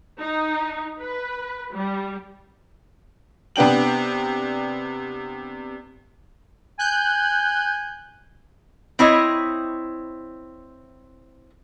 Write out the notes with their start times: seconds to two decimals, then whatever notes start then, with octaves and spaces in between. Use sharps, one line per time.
0.19 D#4
1.01 B4
1.72 G3
3.56 C3 B3 D4 G5 F#7
6.79 G#5 F#6 G6
8.99 C4 E4 C#5 D#5